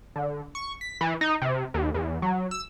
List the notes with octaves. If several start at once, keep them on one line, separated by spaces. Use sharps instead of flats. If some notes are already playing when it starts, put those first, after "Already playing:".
D3
C#6
B6
E3
D#4
C3
D#2
E2
F#3
E6